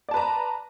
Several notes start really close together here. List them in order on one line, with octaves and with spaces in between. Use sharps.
D5 A5 B4 A#5